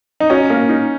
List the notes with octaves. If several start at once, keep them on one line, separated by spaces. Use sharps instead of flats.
D#4
C#4 F#4
A#3
D#4